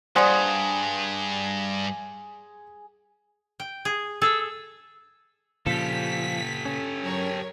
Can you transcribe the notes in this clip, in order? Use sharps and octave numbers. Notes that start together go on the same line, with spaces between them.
G2 G#4 C5 D5 F#5 C6 D#6
G5
G#4
G#4 A4 E6
A#2 C#3 F3 G4 A4 B6
C#4
F#3 A#4 C#5